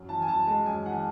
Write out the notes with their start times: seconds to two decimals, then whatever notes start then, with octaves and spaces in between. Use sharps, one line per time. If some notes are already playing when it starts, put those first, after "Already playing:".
Already playing: F#2
0.09 E3 A5
0.22 G#5
0.28 F#2 A5
0.47 G#3 A5
0.66 F#2 G#5
0.86 E3 F#5